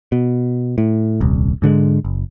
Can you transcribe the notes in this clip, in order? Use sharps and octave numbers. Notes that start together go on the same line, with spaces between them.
B2
A2
D#1 C2
G#2 D3 F3 G#3
F#1